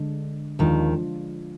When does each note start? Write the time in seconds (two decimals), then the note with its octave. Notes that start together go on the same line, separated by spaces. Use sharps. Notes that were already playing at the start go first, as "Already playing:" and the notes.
Already playing: D3 G#3 D4
0.59 D#2 D#3 F3 G#3 D4 F4